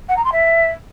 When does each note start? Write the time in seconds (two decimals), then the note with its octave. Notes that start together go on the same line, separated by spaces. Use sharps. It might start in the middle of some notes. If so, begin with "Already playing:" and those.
0.09 F#5
0.17 A#5
0.25 C6
0.32 E5